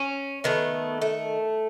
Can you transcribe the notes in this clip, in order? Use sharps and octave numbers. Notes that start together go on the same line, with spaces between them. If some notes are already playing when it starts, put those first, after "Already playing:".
Already playing: C#4
D#3 A3 B3
A3